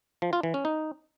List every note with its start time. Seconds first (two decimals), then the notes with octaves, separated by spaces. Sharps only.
0.22 F3
0.33 F4
0.43 E3
0.54 C#4
0.65 D#4